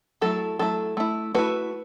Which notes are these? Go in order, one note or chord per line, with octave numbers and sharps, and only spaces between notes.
F#3 A3 E4 A4
F#3 A3 E4 A4
A3 E4
A3 E4 F#4 B4